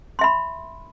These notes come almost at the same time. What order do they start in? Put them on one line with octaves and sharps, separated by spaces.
C6 E5 B5